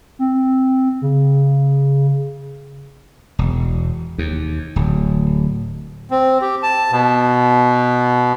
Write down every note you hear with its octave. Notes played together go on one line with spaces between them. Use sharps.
C4
C#3
E1
D#2
D1
C4
G4
A5
B2